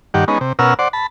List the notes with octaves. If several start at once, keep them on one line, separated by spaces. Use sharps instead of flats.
G2 D#3 G4 F#5
G#3 B3 C#4 D#4
C3
B2 C#4 A#4 F#5 E6 F6
C5 D5 F#5
A5 B5